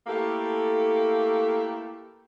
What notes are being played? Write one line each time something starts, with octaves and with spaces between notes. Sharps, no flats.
A3 A#3 E4 G4 A4